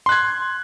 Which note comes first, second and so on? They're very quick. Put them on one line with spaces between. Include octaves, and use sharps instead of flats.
C6 F#6 G#6